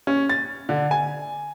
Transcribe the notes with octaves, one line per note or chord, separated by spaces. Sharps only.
C#4
A6
D3
G#5